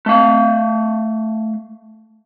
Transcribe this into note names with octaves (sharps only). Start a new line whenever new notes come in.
A3 F5